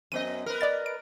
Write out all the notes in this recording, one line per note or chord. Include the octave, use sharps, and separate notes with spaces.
F#2 B3 D#5 D#7
A#4 B4
D5 D#5 A6
D7